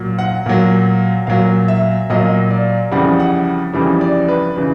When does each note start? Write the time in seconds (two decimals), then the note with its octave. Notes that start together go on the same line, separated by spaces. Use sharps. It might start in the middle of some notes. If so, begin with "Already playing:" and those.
Already playing: A#2 F#3
0.19 F#5
0.46 A#2 F#3
1.27 A#2 F#3 F5
1.68 E5
2.10 A#2 F#3 D#5
2.51 D5
2.92 F2 C#3 E3 G3 F#5
3.20 F#5
3.73 F2 C#3 E3 G3
4.01 D5
4.28 B4
4.56 C#3 E3 B4